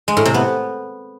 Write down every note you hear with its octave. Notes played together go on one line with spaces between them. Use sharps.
G#3
A2
C3
B3